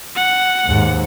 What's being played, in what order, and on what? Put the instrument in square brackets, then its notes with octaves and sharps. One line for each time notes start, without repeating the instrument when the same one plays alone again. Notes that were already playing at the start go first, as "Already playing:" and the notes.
[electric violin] F#5
[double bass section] D#2 G#2